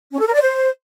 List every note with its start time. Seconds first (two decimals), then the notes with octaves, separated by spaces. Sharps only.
0.13 C#4
0.20 A4
0.26 A#4
0.33 D5
0.40 C5